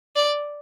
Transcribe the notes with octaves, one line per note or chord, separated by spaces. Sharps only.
D5